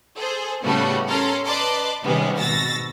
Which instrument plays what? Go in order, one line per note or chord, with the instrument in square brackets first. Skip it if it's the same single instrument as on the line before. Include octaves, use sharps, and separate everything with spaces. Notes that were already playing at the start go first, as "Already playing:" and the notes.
[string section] G#4 A4 C5
A2 C#3 G3 A3 B3 F#4
C#4 A4 A#4 A#5 C6
B4 D5 D#5 A5 C6 D6
C3 D#3 G3 G#3 B3 C#4
G#1 B2 E6 A6 A#6